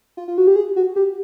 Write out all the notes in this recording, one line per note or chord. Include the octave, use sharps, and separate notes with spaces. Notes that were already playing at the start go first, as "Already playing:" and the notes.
F4
F4
F#4
G4
G#4
F#4
G4